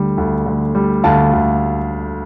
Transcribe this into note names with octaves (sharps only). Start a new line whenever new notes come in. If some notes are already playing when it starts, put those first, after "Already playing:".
Already playing: D2 D3 G3
D2
D3
G3
D2 F5 A5
D2